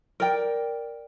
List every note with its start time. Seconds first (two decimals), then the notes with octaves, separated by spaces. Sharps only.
0.20 A#4 D5 G5